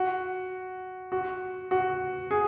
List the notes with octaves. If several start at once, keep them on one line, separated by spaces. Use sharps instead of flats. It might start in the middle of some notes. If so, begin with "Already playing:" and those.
Already playing: F#4
F#4
F#4
G#4